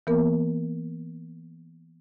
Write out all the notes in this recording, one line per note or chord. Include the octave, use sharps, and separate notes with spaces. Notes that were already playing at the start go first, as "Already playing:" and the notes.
E3 A#3 B3 A#4